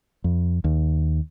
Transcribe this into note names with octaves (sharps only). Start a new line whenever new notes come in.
F2
D#2